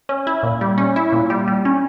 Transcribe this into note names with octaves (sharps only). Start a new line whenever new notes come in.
C#4
E4
A#2
G3
C#4
E4
A#2
G3
G3
C#4